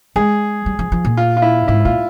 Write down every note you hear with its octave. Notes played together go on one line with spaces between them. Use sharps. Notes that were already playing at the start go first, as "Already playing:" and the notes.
G#3 G#4
G3
F3
F3
A#2
F4
F4
E4
G#2 E4
A#2 F4